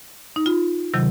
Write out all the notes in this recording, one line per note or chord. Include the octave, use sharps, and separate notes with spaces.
D#4
F4
C3 D#3 F#3